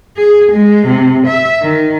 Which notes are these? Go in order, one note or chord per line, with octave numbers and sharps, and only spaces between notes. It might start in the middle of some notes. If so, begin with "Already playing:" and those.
G#4
G#3
C3
E5
D#3